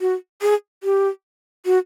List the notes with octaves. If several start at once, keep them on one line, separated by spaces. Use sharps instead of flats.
F#4
G#4
G4
F#4